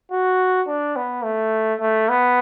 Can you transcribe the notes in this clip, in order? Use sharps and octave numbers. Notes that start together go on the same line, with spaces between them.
F#4
D4
B3
A3
A3
B3